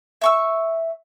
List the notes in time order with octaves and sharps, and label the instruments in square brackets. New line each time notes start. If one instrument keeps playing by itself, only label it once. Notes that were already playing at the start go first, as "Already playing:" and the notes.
[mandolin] E5 C#6 E6